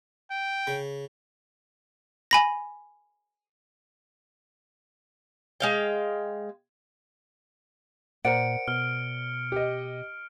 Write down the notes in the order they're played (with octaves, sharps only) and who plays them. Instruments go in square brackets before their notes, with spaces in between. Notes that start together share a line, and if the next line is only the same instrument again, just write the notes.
[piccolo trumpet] G5
[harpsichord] C#3
[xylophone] G#5 B5 A#6
[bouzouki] G#3 F5 G5
[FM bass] A#2 [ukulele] A#4 C5 F#5 [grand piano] D5 [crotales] C#7 D7
[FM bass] B2 [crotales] F6
[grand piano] G4 D#5